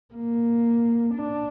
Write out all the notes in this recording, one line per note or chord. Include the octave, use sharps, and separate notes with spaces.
A#3
D4